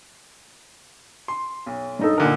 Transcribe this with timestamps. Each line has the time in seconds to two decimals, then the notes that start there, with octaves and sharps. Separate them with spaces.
1.28 C6
1.66 B1
1.99 G2 D#4 A4
2.18 A#2 D3 A#4